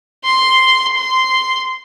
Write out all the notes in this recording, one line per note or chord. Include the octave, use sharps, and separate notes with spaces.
C6
C6